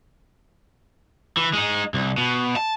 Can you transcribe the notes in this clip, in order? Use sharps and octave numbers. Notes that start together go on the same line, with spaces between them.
E3
G#3 D#4
C2
B2
A5